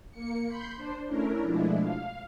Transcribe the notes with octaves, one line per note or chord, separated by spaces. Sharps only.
A#3 C#7
B5 C6 G6
D4 C5
A3 C#4 D4 E4 A#4
B2 F3 G#3 A3 D4 E4
F5